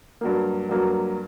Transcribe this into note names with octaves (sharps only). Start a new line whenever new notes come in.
G2 F#3 A#3
G2 F#3 A#3